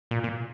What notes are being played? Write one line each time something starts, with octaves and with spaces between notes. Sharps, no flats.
A#2
A#2